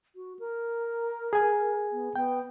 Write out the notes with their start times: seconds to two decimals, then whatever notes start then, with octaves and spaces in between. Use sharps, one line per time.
0.16 F#4
0.39 A#4
1.33 G#4 G#5
1.92 B3
2.16 B3 G5